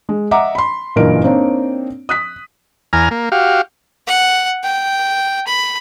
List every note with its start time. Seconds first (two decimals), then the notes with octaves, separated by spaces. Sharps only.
0.09 G#3
0.31 D#5 E5 F#5 A#5 D6
0.55 B5 C6
0.96 F#1 G2 A#2 E3 A#4 D7
1.23 A#3 C4 D4 D#4 C#5
2.09 D#6 F#6 B6
2.93 E2 G#5 A#5 F6
3.11 A#3
3.32 F#4 G4 F5
4.07 F#5
4.64 G5
5.47 B5